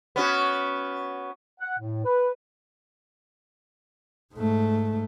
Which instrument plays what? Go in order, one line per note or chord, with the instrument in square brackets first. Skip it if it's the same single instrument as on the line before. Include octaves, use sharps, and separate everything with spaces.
[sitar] B3 C#4 F#4
[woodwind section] F#5
A2
B4
[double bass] G#2 A3